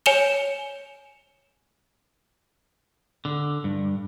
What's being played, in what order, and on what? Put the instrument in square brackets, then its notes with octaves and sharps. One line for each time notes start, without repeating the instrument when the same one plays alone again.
[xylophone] C#5 G#5 C#7 E7 F7 G7
[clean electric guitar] D3
G2